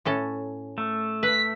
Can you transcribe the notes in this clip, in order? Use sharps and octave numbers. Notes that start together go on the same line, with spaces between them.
A2 C#4 A4
A3
B4 B6